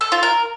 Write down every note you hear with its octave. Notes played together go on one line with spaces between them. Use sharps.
A4
F4
A#4